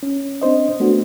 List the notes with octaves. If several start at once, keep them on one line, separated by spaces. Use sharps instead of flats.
C#4
C4 D4 C5 D#5
A3 B3 D4 F#4